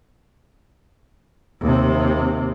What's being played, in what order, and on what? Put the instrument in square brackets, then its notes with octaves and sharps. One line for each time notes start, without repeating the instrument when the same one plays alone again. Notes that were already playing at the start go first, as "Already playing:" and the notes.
[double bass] D#2 C3